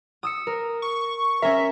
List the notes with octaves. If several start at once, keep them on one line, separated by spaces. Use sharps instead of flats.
D#6 E6 C#7
A#4
C#6
C#4 A#4 E5